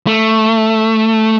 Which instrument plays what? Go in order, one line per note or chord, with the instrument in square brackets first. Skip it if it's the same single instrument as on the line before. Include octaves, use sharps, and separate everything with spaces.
[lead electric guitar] A3